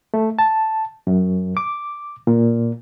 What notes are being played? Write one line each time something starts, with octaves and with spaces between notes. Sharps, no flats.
A3
A5
F#2
D6
A#2